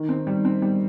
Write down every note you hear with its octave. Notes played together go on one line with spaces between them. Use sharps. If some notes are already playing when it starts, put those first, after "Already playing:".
Already playing: D#3
C4
G3
C4
G3